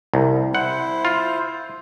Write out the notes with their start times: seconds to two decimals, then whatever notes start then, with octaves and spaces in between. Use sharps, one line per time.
0.14 C2
0.55 E4 C5 F#5
1.05 F4